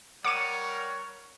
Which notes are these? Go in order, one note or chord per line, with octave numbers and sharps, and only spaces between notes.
G3 A#4 C#5 F#5 C#6 D6 D#7